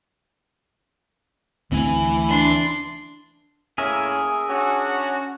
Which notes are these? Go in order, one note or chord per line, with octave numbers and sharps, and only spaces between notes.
D2 E3 A3 C4 G#5
D4 C6
A2 A#3 C#4 G#4 A#4 E5
C#4 D4 F#4